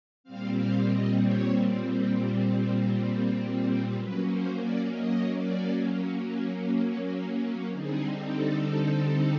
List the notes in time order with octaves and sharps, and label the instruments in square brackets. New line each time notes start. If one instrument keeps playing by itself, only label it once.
[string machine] A#2 G3 C4 F5
F5
D#5
C#5
F#3 A#3 C#4 B4
C5
D5
D#5
D5
D3 G3 C4 D#4 G#4
A4